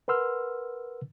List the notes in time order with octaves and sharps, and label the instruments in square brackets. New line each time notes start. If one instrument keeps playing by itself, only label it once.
[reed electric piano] A#4 B4 F#5 C6 E6 F6